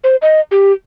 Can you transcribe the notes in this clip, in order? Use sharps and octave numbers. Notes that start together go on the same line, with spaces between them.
C5
D#5
G4